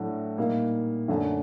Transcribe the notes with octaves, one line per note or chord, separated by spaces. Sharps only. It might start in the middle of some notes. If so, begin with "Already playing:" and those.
Already playing: A2 F#3 A3 D4 F#4
A#2 G3 A#3 D#4
F#2 D3 F#3 A3 D4